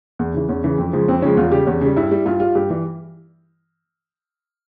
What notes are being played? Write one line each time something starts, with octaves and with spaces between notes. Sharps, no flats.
E2
C#3 E3
E2 C#4
C#3 E3
F2
C#3 F3 G#3
F2 C4
C#3 F3 G#3 C#4
E2 F4
C#3 G3 G4
E2 C#4
C#3 G3
G2 E4
G3
G2 F4
G3 F4
G2 G4
E3 G3